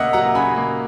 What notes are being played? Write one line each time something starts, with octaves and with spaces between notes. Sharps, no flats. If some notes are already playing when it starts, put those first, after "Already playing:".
Already playing: C#3 A#3 D#5 E5 F#5
F#3 F#5 A#5
C#3 G#5 B5
A#3